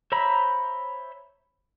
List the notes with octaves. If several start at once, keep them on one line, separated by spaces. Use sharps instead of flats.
C5 C#5 E5 A#5 B5